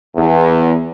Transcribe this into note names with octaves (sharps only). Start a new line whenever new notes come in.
E2